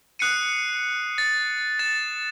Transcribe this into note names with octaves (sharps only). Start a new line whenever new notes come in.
D#6 F#6 C7 C#7 D#7
A6
A6 E7